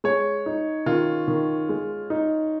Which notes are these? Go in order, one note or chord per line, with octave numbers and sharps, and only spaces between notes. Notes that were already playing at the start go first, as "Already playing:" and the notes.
G#3 C#5
D#4
D#3 F4
D#3
G#3
D#4